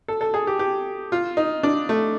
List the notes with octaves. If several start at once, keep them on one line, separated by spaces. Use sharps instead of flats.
A4
A4
G#4
G4
G4
F4
D#4
D4
A3